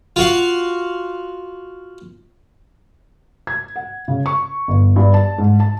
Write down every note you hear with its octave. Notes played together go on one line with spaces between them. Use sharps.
F4 F#4 F5
G#6
F#5
C#3
C#6
G1
G2
A5
G#2
A5